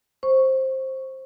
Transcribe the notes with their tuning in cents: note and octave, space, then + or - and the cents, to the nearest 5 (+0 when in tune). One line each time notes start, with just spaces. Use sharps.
C5 +15 C#6 +0